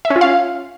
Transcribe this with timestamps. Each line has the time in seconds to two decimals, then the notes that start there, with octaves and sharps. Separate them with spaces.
0.05 E5
0.10 C#4
0.16 F4
0.21 F5